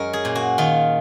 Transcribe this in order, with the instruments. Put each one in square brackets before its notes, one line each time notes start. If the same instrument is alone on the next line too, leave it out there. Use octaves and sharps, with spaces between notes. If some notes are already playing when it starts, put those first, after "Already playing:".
Already playing: [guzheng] F#2 G#3 C#4 A#4
G#4
A#2
F#4
D#3 F4